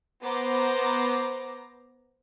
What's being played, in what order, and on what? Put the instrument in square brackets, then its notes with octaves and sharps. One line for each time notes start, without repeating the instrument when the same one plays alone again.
[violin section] B3 C5 A#5 D6